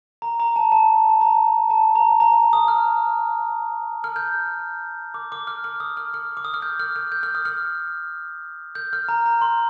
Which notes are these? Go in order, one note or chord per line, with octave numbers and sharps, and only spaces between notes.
A#5
A#5
A5
A5
A5
A#5
A5
A#5
A#5
D#6
F6
F6
G6
D6
D6
F6
F6
D#6
F6
F6
D6
D#6
F6
G6
F6
G6
G6
F6
D#6
F6
G6
F6
A#5
A#5
C6